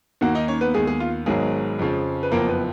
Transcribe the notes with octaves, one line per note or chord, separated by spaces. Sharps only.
D#2 D#3 A#3 F#4 F#5
D#4 D#5
C#4 C#5
B3 B4
D#2 D#3 G#3 B3 G#4
G#3 G#4
F4
G#1 G#2 F#3 G#3 B3 G#4
F2 C#3 F3
B4
F#1 F2 F3 A#3 B3 A#4
B3 B4